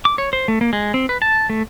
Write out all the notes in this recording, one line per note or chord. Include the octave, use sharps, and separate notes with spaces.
D6
C#5
C5
A3
A#3
G#3
C4
B4
A5
A3